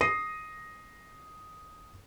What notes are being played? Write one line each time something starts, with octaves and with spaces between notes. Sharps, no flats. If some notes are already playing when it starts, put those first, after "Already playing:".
D#6 A#6 C7 D#7